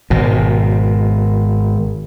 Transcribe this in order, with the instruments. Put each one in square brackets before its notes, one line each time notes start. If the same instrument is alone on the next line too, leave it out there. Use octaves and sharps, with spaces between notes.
[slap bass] G#1 B2